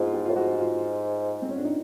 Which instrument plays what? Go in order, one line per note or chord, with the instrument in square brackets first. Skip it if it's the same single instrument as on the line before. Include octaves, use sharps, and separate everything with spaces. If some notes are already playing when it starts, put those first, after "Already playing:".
Already playing: [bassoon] G#2 [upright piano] B3 E4 F4
[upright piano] G4
[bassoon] A2 [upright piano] F4
[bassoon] G#2 [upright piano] F#4
[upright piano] F4
C4
C#4
D4
D#4